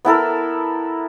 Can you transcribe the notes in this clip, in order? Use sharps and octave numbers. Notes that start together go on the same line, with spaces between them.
B3 E4 A4 A#4